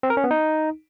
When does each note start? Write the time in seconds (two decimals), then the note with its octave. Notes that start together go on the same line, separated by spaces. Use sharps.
0.03 C4
0.10 A#4
0.17 C#4
0.24 B3
0.31 D#4